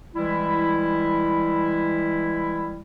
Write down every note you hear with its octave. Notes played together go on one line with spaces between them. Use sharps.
E3 G3 G#3 E4